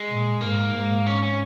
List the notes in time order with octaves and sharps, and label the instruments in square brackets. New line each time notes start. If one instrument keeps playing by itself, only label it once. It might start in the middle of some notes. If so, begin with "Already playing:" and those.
Already playing: [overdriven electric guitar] G#3
[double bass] A#2
[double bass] G#2 [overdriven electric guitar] A#3
[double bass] G#2
[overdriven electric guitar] C#4
C#4